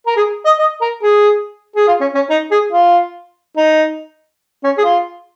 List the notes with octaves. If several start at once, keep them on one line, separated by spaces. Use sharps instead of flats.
A#4
G#4
D#5
D#5
A#4
G#4
G#4
F4
C#4
C#4
D#4
G#4
F4
D#4
C#4
G#4
F4